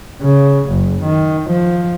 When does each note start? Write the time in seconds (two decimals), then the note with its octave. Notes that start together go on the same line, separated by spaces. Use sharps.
0.22 C#3
0.70 F#1
1.04 D#3
1.50 F3